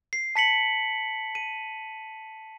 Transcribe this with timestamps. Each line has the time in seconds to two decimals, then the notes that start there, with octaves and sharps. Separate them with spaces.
0.13 C7
0.36 A5 B6 C#7 F#7
1.35 D#7